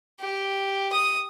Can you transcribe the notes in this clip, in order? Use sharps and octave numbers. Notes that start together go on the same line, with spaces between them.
G4
D#6